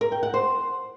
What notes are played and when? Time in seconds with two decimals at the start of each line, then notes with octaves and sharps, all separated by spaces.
0.01 A#4
0.12 G5
0.23 F#5
0.34 C5